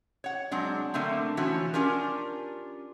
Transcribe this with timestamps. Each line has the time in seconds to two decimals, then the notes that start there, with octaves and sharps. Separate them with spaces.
0.24 C#5 F#5
0.51 F#3 G#3 C4 D4
0.94 D3 A3 A#3 C4
1.37 E3 F3 C#4 F#4
1.74 C#4 D4 F4 G4 A#4